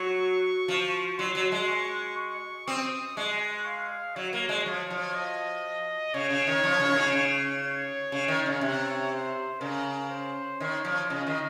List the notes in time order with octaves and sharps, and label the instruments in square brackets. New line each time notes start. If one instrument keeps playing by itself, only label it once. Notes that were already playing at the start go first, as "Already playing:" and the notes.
Already playing: [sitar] F#3 [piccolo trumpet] C#6
[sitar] F3
[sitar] F#3 [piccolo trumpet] C6
[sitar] F#3
G#3
[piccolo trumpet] C#6
C#6
[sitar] C4 [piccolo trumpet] D#6
[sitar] G#3 [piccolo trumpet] C#6
[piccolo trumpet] F5
[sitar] F#3 [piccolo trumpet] C#5
[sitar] A#3
G#3
[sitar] F3 [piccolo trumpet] C#5
[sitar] F3
[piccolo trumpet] D#5
[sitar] C#3 [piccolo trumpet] C#5
[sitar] C#3
D#3
F3
C#3
D#3
C#3
C#3
[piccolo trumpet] C#5
[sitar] C#3
D#3
C#3
C3
[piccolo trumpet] C5
[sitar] C#3 [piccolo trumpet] A#4
[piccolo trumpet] C5
[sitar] D#3 [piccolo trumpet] C#5
[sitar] F3
[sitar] C#3 [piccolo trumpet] D#5
[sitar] D#3